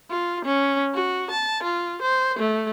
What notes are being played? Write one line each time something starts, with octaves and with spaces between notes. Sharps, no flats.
F4
C#4
F#4
A5
F4
C5
A3